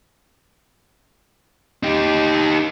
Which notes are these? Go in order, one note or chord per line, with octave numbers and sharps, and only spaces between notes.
D#4 G4